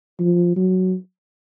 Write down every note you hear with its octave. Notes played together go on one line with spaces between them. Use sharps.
F3
F#3